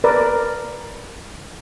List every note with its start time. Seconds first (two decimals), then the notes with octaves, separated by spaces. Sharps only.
0.04 A#4 B4 D5